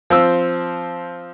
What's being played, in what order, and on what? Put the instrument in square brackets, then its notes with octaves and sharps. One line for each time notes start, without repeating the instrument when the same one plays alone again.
[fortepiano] F3 C4 E6